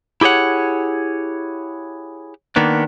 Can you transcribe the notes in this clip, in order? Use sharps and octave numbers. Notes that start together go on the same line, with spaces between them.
E4 G4 G#4 C#5 F#5
D#3 A#3 B3 D4